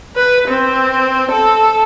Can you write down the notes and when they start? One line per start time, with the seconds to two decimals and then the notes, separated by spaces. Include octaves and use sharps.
0.16 B4
0.48 C4
1.32 A4